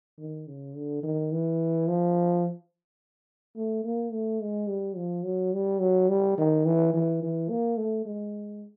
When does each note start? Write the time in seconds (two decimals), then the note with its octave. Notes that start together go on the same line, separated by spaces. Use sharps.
0.18 D#3
0.48 C#3
0.76 D3
1.03 D#3
1.32 E3
1.88 F3
3.56 A3
3.85 A#3
4.12 A3
4.41 G#3
4.69 G3
4.96 F3
5.25 F#3
5.54 G3
5.81 F#3
6.09 G3
6.38 D#3
6.65 E3
6.94 E3
7.23 E3
7.50 A#3
7.78 A3
8.06 G#3